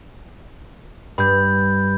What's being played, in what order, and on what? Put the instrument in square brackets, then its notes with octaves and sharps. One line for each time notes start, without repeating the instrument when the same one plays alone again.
[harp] G2 [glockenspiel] B5 G6